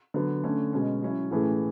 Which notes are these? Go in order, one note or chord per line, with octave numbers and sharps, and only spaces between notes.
D3 F#3 B3
D3 A3 C#4
B2 G#3 C#4
F#3 C#4 E4
A2 E3 A3 C#4 G#4